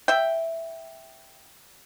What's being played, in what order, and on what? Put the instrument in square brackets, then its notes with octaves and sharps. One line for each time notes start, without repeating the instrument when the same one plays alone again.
[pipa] E5 G5